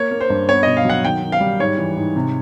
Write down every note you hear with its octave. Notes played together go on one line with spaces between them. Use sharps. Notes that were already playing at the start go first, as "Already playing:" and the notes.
Already playing: A#3 C#5
A#3
C5
G2
B3 C#5
B2 D#5
F5
F#3 F#5
D#3 G5
D#3
F5
G3
G#2 C#5
E3
G#2
C3